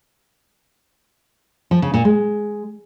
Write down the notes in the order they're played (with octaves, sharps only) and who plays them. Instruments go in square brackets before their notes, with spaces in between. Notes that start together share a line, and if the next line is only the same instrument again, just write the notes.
[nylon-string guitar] F3
C#3
A#2
G#3